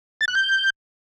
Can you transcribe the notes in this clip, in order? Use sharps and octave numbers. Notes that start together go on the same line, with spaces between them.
A6
F#6
G6